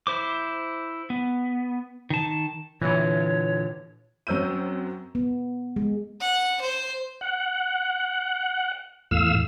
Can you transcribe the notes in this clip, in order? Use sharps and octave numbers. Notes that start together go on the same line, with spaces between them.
E4 C5 D6
B3
D#3 A5
A#2 D3 E3 C#5
F#2 F#3 C4 E6 G6 D#7
B3
G#3
F#5
C5
F#5
E2 A2 F5 E6